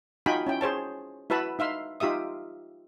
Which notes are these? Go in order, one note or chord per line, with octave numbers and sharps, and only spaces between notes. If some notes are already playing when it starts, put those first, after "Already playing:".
D#4 F4 F#4 G5 G#5 B5
C#4 E4 G5
G#4 C5 C#5 A5
E4 F#4 B4 E5 A5 B5
D#4 E5 F5 C6
D#4 F4 G4 E5 D#6